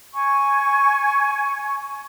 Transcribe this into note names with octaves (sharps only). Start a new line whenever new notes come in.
G#5 C#6